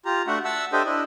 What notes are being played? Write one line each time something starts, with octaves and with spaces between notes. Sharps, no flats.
F4 G4 A#5
A3 D4 F#4 E5 F#5
E5 F#5 A5 E6
D4 G4 A4 C5 D#5 E5
D4 E4 D#5